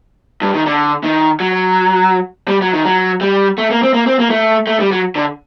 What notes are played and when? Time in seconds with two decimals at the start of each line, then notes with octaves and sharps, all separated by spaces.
0.42 G2
0.54 D#3
0.66 D3
1.03 D#3
1.40 F#3
2.48 G3
2.61 F#3
2.73 D#3
2.85 F#3
3.21 G3
3.58 A3
3.71 A#3
3.83 C4
3.94 A#3
4.07 C4
4.19 A#3
4.30 A3
4.67 A3
4.80 G3
4.92 F#3
5.15 D3